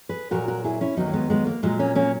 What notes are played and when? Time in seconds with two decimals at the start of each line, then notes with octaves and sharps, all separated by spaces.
0.09 G#4 B4
0.31 A#2 F#3 F#4 A#4
0.48 F#4 A#4
0.64 E4 G#4
0.81 C#4 E4
0.97 D#2 D#3 F#3 B3 D#4
1.08 A#3
1.13 G#3 B3
1.30 G#3 B3
1.47 A#3
1.63 A#2 F#3 G#3
1.79 A#3 C#4
1.95 A#3 C#4